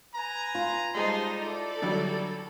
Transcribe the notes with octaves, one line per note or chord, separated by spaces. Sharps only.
B4 G#5 A#5
F4
G3 G#3 D#4 C5 D#5 A5 C6
D#4 E4 A4 D5
D3 F#3 G3